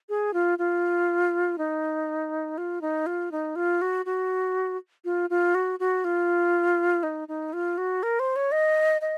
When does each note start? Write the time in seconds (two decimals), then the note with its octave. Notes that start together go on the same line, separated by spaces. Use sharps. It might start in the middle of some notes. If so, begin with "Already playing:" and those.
0.09 G#4
0.33 F4
0.58 F4
1.58 D#4
2.58 F4
2.81 D#4
3.06 F4
3.31 D#4
3.56 F4
3.81 F#4
4.05 F#4
5.05 F4
5.30 F4
5.55 F#4
5.79 F#4
6.04 F4
7.03 D#4
7.28 D#4
7.53 F4
7.78 F#4
8.03 A#4
8.19 C5
8.36 C#5
8.52 D#5
9.01 D#5